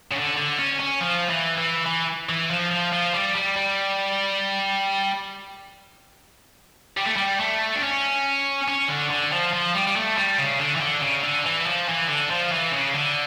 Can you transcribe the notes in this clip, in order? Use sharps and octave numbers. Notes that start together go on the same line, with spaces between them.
C#3
D3
D3
C#4
C#4
F3
E3
E3
E3
E3
F3
F3
F3
G3
G3
G3
G3
A3
G3
A3
D4
C#4
C#4
D3
D3
F3
F3
G3
G3
A3
G3
C#3
D3
E3
D3
C#3
D3
E3
F3
E3
D3
F3
E3
C#3
D3